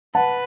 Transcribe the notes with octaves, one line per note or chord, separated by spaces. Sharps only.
B4 F#5 A5